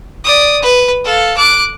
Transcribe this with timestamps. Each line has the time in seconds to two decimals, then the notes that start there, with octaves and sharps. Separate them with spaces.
0.25 D5 D#6
0.62 B4
1.05 A4 F5
1.37 D6 F#6